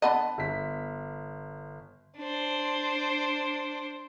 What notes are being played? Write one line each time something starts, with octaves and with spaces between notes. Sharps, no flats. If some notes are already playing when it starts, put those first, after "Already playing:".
D3 B3 D#5 F#5 A5 B5
G1 B6
D4 C5